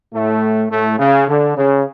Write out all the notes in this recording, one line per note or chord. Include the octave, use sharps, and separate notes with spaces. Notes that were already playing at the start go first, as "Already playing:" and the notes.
A2 A3
A2 A3
C#3
D3
C#3